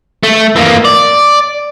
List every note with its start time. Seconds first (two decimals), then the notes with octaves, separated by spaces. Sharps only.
0.23 A3
0.56 E3 A#3
0.85 D5